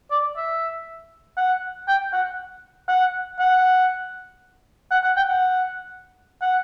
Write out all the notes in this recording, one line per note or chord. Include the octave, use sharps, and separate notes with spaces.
D5
E5
F#5
G5
F#5
F#5
F#5
F#5
F#5
G5
F#5
F#5